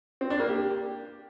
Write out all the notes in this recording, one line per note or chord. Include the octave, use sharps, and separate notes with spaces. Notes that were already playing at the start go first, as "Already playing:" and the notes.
C4
D4
A#3
G4